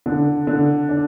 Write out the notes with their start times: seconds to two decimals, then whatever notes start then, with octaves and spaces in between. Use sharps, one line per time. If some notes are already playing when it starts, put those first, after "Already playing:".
0.06 D3
0.47 D3
0.89 D4